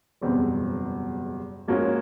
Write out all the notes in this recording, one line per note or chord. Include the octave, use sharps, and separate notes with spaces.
F#1 E2 B2 G3 C4
G#2 F3 A#3 C#4 F#4